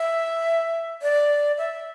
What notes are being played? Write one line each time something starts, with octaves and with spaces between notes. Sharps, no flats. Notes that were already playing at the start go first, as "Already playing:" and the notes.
Already playing: E5
D5
E5